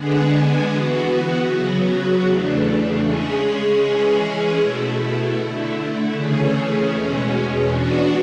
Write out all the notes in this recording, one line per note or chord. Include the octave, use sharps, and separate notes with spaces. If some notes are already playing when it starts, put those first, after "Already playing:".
Already playing: D3 G#3 B3 D4 G#4
E3 B3 F#4
C#3 F#3 B3 F#4
E2 C#3 E3 A3 D4
C#3 G#3 C#4 G#4
E3 G#3 C#4 G#4
B2 A3 E4
D3 A3 E4
C#3 E3 A3 C#4 G#4
E2 B2 G#3 C#4
E3 B3 D4 F#4